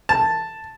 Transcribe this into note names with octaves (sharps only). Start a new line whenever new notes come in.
A5